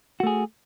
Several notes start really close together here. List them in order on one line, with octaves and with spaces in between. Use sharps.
F#4 A3 G#4